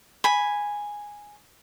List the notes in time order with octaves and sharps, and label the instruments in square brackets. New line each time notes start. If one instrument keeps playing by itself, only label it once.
[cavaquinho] G#5 B5